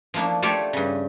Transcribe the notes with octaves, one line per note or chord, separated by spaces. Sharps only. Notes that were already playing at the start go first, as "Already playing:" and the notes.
F3 A3 A#3 D4 E4
A3 F4 G4 A4 C#5 D5
G2 C#3